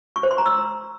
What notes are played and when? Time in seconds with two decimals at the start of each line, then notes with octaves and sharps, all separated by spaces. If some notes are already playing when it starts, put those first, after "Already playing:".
0.16 C#6
0.23 C5
0.31 C6
0.38 A#5
0.46 E6